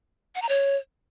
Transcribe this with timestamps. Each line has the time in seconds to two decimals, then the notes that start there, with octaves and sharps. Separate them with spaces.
0.35 F#5
0.42 A#5
0.49 C#5